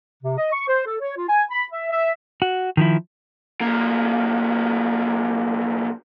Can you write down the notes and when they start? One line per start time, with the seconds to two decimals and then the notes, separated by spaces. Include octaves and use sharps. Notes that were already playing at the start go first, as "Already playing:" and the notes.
0.22 C3
0.38 D#5
0.52 C#6
0.67 C5
0.85 A4
1.00 C#5
1.16 F4
1.28 G#5
1.50 B5
1.72 E5
1.91 E5
2.42 F#4
2.77 D#3 F3 E4
3.61 B1 A#3